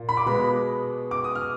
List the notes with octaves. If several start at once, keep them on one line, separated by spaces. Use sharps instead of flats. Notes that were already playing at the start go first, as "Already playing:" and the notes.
Already playing: A#2
B5
D6
B2 G#3 B3 B5
D6
D#6
F6